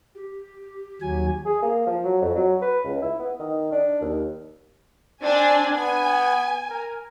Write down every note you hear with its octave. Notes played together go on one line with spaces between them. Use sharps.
G4
D#2 F#3 G#5
G#4
A#3
F3
F#3
F2
F#3
B4
C#2
E4
B3
D#3
D4
D#2
C4 D4 G#5
B3 G#5
A#4